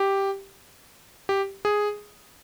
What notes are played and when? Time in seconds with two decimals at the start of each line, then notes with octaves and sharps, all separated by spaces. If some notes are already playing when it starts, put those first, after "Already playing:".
Already playing: G4
1.29 G4
1.65 G#4